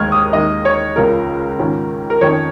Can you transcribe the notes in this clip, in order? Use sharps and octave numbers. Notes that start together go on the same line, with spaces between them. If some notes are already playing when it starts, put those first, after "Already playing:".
Already playing: D#2 D#3 G#3 D#4 F6 G#6
D#6
D#2 D#3 G#3 D#5
C#5
C#2 C#3 F3 A#4
G#2 D#3 C#4 F4
A#4
F2 D#3 C#4 C#5